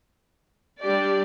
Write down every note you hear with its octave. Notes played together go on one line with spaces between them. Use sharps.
G3 D4 G4 D5